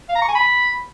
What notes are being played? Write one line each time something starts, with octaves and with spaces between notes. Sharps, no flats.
F5
A#5
C#6
G#5
B5